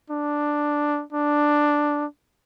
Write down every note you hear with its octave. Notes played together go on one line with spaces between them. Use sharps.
D4
D4